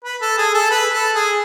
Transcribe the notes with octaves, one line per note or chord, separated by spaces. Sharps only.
B4
A4
G#4
A4
B4
A4
G#4